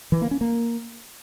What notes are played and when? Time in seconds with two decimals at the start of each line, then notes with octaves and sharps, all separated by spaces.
0.12 E3
0.22 A#3
0.31 C#4
0.41 A#3